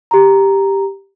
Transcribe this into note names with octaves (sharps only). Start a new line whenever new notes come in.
G4 A#5